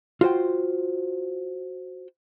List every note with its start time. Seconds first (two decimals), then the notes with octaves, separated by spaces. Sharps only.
0.21 F4 F#4 C5 G5